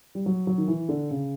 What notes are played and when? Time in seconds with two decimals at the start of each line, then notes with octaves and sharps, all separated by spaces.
0.15 G3
0.26 F#3
0.47 F#3
0.58 D#3
0.68 E3
0.89 D3
1.11 C#3